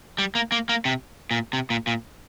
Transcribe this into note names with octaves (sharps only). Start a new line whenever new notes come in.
G3
A#3
A#3
A#3
C3
A#2
C3
A#2
A#2